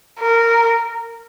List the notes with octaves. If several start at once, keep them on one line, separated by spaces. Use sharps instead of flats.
A#4